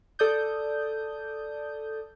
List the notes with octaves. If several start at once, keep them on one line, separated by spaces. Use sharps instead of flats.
A4 D5 D#6 G6